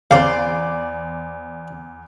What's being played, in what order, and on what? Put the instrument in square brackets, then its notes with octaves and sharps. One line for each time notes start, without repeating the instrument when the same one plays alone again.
[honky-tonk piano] E2 [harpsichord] C#3 C4 [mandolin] C5 D5 [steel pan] F5